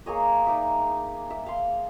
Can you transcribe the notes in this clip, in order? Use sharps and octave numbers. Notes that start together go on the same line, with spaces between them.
A#3 G#4 C#5 D#5
D#4 D5 E5
E5
F5 C6